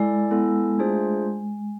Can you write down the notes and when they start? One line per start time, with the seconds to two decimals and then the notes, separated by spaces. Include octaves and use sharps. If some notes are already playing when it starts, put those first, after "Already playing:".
Already playing: G#3 E4 A4 D5
0.31 B3 E4 A4
0.78 A3 D4 F4 G#4 C5